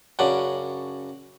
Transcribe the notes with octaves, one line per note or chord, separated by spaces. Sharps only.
F#2 C#3 D4 F#5